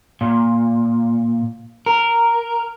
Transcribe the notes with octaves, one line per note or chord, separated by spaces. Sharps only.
A#2
A#4